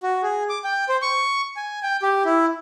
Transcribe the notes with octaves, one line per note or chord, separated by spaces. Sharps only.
F#4
G#4
D6
G5
C5
C#6
G#5
G5
G4
E4